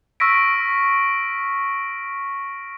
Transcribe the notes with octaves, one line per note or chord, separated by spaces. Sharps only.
C#6 E6 F6 A#6 B6 D7